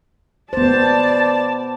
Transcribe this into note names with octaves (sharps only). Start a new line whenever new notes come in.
B3 C5 D5 A5